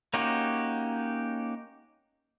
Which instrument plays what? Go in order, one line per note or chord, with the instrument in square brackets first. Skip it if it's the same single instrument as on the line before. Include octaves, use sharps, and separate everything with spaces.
[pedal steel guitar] A#3 C#4 D#4 F#4 G4